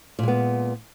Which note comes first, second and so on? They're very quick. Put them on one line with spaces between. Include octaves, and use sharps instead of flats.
A#2 G#3 B3